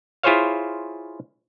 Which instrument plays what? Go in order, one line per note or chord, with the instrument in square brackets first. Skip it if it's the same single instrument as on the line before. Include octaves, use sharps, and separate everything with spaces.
[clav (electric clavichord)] E4 F4 G#4 C5 C#5 F5